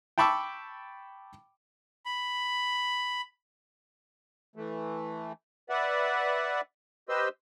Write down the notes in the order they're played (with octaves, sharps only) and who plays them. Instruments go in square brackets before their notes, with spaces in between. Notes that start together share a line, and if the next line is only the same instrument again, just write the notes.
[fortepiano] G5 A5 B5 C#6 D6 E6
[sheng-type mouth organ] B5
[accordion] E3 A3
B4 D5 E5 F#5
G4 B4 C5 D#5 C6 E6